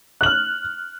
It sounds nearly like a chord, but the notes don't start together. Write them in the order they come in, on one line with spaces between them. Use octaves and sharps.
F#6 F#7 F6